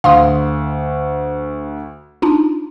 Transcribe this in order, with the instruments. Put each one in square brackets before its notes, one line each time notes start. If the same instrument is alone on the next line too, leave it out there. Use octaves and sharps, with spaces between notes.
[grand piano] D2 [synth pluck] F5 C6 D#6
[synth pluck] D4 D#4 F4